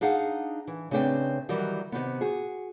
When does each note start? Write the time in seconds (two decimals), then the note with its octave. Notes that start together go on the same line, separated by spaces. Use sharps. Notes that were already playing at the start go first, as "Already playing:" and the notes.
0.01 D4 D#4 G#4 F5 F#5
0.67 E3
0.91 C#3 A3 C4 D4 B4 G5
1.49 D#3 E3 F#3 G3
1.92 C3 D#3 B3
2.21 F#4 G#4